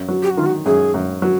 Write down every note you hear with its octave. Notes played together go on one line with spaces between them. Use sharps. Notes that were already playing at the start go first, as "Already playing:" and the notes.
Already playing: F#2
F#3
G4
F#4
D#3 F4
F#4
F#2 G#4
F#2
F#3